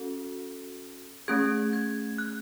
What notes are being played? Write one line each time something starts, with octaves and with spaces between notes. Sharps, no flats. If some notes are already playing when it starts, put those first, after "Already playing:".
Already playing: C#4 F#4 A4
A3 C#4 G#4 G#6
G#6
F#6